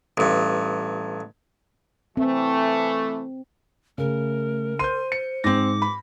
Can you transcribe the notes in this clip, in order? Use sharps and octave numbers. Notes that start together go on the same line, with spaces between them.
A1 G2
E3 A3 C4
C#3 A3 A#4
C5 C6 G6 D#7
C#7
G#2 C4 D6 A#6
B5